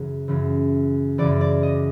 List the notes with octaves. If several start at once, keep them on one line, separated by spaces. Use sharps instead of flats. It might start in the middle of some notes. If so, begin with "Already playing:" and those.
Already playing: F#2 C#3 E3
F#2 C#3 E3
F#2 C#3 E3 D5
D5
D#5